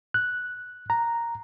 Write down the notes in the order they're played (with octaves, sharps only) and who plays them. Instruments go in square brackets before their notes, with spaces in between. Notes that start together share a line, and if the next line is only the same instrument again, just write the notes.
[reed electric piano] F#6
A#5